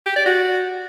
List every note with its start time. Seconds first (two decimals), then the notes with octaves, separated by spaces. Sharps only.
0.06 G4
0.16 D5
0.26 F#4